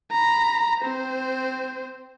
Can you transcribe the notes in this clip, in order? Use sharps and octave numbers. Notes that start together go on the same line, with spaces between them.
A#5 B5
C4 C5